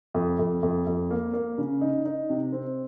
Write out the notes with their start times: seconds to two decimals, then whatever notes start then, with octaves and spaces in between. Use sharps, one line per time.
0.14 F2
0.39 F2
0.63 F2
0.87 F2
1.11 A#3
1.34 A#3
1.58 C#3
1.81 D#4
2.06 D#4
2.30 C3
2.52 C4